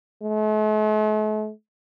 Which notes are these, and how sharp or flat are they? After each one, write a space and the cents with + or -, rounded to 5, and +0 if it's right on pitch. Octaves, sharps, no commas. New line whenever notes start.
A3 -45